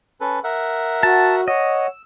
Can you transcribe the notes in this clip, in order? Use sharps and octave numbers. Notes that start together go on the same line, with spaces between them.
C#4 A4 B4
A#4 E5 F#5
F#4 A5
C#5 D#5 F#5 E6